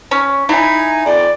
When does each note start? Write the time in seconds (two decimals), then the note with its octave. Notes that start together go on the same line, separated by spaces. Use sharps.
0.11 C#4
0.49 D#4 E4 G#5
1.06 F2 D5